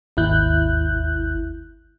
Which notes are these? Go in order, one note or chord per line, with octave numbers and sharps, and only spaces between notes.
G#1 D#2 E4 F#6 G6